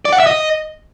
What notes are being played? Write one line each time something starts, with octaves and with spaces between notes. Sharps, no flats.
D5
F#5
E5
D#5